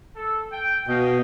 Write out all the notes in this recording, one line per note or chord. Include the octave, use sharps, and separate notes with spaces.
A4
G5
B2 D#5 F5 G5